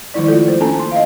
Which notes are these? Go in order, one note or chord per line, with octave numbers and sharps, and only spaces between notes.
D#3 F3 G#3 E4 D5
A3 F4 A4
C5
A#3 C#4 D4 A4 A5 A#5
C6
D#5 F5